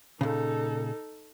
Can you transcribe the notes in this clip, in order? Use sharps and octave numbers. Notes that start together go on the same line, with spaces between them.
A#2 C#3 D#4 A4